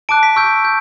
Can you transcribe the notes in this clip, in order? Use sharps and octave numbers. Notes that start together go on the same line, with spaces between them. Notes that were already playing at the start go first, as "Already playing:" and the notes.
A5 D6 F#6 D7
B6
C#6 E6 G6 D7
G6